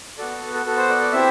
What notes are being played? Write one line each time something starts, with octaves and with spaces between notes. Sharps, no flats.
B3 F#4 A4 D5
A4
B3 F#4 A4
C5
D5
D5
C4 E4 G4 E5